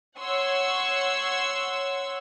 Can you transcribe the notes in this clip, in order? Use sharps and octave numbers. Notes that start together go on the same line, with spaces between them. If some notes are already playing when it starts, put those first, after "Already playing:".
C#5 F#5 C6 C#6 E6